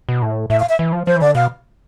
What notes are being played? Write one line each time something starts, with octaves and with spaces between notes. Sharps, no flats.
B2
A2
A2 E5
F5
E5
E3
F3
F3 C5
E3
D3 D5
B2 F5